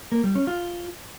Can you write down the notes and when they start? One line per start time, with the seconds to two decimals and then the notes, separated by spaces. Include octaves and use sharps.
0.12 A#3
0.24 G3
0.35 C#4
0.47 F4